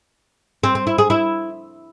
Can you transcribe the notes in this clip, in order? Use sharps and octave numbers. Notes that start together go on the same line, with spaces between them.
C4
C4
E4
G#4
E4